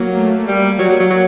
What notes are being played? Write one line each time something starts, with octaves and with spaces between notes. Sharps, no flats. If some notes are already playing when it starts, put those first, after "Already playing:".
Already playing: F#3 A#3
A3
G3 A#3
F#3
F#3
F#3
F#3